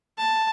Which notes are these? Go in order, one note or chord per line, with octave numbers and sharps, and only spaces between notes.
A5